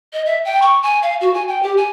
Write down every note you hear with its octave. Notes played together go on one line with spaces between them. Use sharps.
D#5
E5
G5
C#6
G#5
F5
F#4
G#5
G5
G4
G#5